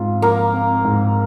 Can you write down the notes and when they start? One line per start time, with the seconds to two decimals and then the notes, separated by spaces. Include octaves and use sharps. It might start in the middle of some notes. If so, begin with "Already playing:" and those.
Already playing: G#2 C4 F4
0.22 F3 A#3
0.53 C4
0.85 G#2